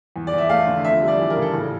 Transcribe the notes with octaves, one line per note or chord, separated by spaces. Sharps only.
E2
D5
E2 E5
A3 F5
D3
F2 E5
G3
D5
E3
A#4
C#3
A4
A2